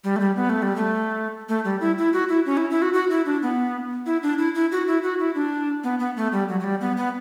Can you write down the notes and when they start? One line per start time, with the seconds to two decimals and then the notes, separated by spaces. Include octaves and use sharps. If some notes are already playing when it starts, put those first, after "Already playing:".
0.04 G3
0.16 A3
0.20 G3
0.36 B3
0.49 A3
0.62 G3
0.76 A3
1.49 A3
1.65 G3
1.81 E4
1.98 E4
2.13 F#4
2.29 E4
2.46 C#4
2.57 E4
2.70 E4
2.82 F#4
2.93 F#4
3.10 E4
3.26 D4
3.43 B3
4.06 E4
4.23 D4
4.38 E4
4.55 E4
4.72 F#4
4.87 E4
5.03 F#4
5.20 E4
5.35 D4
5.84 B3
5.99 B3
6.17 A3
6.33 G3
6.49 F#3
6.60 F#3
6.64 G3
6.81 B3
6.97 B3